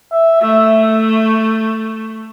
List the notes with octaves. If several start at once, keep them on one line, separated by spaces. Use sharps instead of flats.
E5
A3 E5